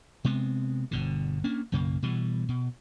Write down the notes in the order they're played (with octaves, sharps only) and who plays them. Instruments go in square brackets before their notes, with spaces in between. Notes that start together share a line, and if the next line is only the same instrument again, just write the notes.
[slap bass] C3 G#3 B3 C4
G1 B2 D3
A#3 C#4 D4
B1 F#2 C#3 A#3
B2 E3 G3
B2